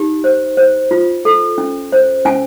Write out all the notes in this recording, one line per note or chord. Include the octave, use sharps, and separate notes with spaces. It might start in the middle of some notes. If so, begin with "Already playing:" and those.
Already playing: D#4 G4
C5
C5
F4
A4
C#4
C5
C#4 G#5